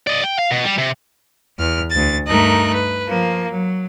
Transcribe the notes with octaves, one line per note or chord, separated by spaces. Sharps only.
D5 D#5
G5
F5
B2
G3
C3
E2 F6
D2 A6
G2 A3 D#4 A#4 F#6
B4
F3 A#3
F#3